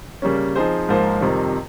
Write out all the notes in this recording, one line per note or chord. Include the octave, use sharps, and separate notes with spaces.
C#3 G3 A#3 C#4
F3 C4 D#4 G#4 C5
G#2 F3 A#3 F4 C5
F2 C3 D#3 G3